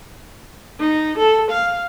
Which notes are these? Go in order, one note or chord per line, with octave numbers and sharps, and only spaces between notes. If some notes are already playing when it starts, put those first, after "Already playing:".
D#4
A4
F5